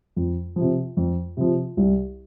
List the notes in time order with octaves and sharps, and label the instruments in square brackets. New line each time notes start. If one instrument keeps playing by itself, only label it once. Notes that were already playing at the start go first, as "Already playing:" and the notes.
[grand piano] F2
C3 F3
F2
C3 F3
C2